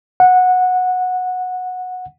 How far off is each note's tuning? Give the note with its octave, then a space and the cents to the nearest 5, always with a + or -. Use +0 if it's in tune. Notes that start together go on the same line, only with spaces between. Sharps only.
F#5 -15